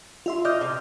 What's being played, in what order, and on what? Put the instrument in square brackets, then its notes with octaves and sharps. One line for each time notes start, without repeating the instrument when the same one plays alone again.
[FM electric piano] F4 E5 C6
[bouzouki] D#5 [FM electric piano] D6 F6 G6
[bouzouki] C3